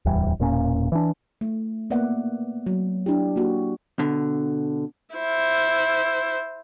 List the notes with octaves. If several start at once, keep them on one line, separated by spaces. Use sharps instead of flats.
D1 E2 E3 G3
E1 A#2 A#3 C#4
E3 D4
A3
A#3 B3 D5 E5 F#5
F#3
D4 E4 G4
A#3 F#4
B2 D3
E4 C5